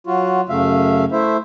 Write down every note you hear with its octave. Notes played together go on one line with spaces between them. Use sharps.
F#3 F4 F#4
F#2 C#3 A3 E5 F5
A3 E4 C5 E5